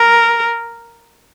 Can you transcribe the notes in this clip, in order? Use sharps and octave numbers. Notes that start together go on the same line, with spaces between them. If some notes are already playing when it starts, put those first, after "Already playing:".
Already playing: A#4